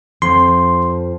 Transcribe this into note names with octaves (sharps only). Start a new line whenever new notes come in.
F2 F3 C6